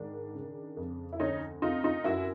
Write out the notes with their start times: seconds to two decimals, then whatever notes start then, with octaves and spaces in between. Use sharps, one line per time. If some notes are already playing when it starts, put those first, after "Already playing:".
Already playing: G#2 D#3 D4
0.34 C#3
0.77 F2
1.13 E4
1.19 D2 C#4 D#4
1.62 C3 D#4 F4
1.83 D#4 F4
2.04 F#2 E4 F#4